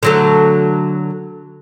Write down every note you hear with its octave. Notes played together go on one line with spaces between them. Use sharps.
D3 F#3 A3